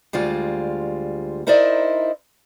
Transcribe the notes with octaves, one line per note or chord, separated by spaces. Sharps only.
D2 G3 G#3 F4
D#4 E4 A#4 C5 D5 D#5